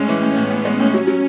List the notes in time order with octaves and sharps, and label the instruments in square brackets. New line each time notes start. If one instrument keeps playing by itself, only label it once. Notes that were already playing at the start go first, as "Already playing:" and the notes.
Already playing: [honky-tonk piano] A2 G#3 [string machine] C#4
[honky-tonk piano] E3
A2
[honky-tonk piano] A2 [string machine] B3
[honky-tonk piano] A2
[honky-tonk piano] G#3 [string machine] C#4
[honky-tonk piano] A2
[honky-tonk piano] F#3 [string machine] C#4
[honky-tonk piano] F#3